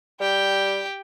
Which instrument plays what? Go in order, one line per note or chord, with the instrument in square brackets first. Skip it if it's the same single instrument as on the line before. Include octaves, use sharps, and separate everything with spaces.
[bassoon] G3 [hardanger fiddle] G4 G5